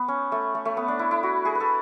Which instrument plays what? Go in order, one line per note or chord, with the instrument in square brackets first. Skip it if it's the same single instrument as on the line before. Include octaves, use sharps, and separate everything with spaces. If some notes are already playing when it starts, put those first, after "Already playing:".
Already playing: [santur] B3
C#4
A3
A3
A3
B3
D4
E4
E4
F#4
G#4
B4
A4